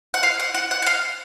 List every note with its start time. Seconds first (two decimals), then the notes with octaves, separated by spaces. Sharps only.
0.14 F#5
0.23 F5
0.40 F#5
0.54 F#5
0.71 F#5
0.82 F#5
0.86 F5